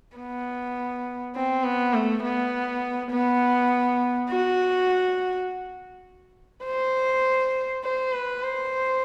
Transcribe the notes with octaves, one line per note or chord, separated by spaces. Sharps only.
B3
C4
B3
A3
B3
B3
F#4
C5
C5
B4
C5